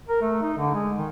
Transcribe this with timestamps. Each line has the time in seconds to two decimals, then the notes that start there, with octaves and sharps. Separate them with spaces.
0.09 A#4
0.22 A3
0.42 D#4
0.57 D3
0.74 G#3
0.98 D#3